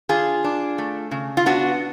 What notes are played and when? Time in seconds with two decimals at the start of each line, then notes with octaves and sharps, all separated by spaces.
0.09 D4 F4 G#4
0.44 D4
0.78 A3
1.11 C#3
1.37 F4
1.46 B3 D4 F#4